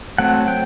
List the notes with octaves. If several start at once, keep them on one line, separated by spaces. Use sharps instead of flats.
F#3 A3 C4 F#5
G5